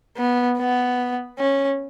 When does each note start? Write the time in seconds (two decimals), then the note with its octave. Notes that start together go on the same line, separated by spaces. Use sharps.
0.17 B3
0.58 B3
1.39 C#4